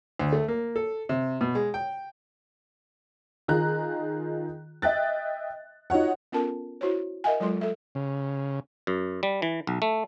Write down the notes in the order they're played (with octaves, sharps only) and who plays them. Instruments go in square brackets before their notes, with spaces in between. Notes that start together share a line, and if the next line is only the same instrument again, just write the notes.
[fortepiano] D2
A3
A#3
A4
C3
B2
G#3
G5
[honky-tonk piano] D#3 F4 G#4 A#5 F#6
D#5 E5 G5 F#6 A6
D#4 F4 F#4 C#5 F#5
[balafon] B3 C#4 F4 A4 A#4 A5
E4 F#4 C5 C#5
A#4 D#5 E5 F#5 G#5
F#3 G#3 F4 A4 C6
A4 E5
[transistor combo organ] C#3
[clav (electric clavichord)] F#2
G3
E3
B1
A3